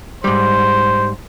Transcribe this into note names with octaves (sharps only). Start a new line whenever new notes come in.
G#2 G3 C5